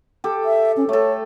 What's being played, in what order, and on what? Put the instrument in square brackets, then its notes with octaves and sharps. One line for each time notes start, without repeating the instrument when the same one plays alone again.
[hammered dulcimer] G4 A4
[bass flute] E5
C#4
[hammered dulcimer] A3 A4 [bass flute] C#5